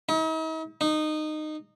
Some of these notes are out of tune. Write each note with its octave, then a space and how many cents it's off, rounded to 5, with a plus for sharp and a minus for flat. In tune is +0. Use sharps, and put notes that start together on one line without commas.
D#4 +45
D#4 -20